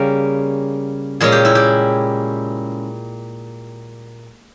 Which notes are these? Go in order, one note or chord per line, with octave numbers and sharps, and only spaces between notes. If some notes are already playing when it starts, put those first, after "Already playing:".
Already playing: C#3 G3 A#3 C#4 A#4
A#2 G#3 C#4 G#4
G4
E4
G4